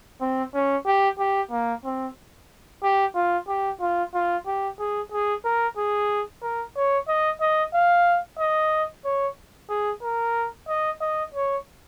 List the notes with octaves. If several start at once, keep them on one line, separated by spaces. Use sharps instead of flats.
C4
C#4
G4
G4
A#3
C4
G4
F4
G4
F4
F4
G4
G#4
G#4
A#4
G#4
A#4
C#5
D#5
D#5
F5
D#5
C#5
G#4
A#4
D#5
D#5
C#5